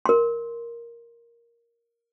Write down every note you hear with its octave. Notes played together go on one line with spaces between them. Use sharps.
A#4 C6